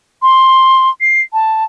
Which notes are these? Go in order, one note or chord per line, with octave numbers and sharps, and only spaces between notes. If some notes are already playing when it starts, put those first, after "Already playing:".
C6
C7
A5